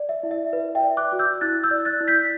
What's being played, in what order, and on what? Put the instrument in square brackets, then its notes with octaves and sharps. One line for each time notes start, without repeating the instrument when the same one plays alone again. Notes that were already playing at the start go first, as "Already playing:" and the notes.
Already playing: [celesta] D5
E5
E4
E5
B4 E5
E5 G5
D5
D6 F#6
F#4
E6 G6
E4 F#6 A6
E6 G6
D5
F#6 A6
E4
G6 B6